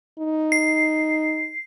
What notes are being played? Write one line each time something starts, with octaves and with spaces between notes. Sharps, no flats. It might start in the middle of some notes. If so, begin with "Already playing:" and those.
D#4
C7